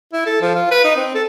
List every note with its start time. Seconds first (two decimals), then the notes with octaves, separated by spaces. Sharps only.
0.13 E4
0.26 A4
0.41 F3
0.55 F4
0.71 B4
0.84 D#4
0.96 C4
1.15 A4